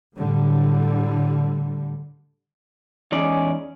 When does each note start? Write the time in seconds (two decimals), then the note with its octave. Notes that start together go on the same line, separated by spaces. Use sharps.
0.17 A2 D3 G3
3.12 E2 G#3 C#4 D#4 D5